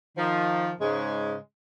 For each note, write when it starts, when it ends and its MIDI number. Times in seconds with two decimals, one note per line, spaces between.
0.17 0.71 51
0.17 0.71 53
0.80 1.36 44
0.80 1.36 49
0.80 1.36 56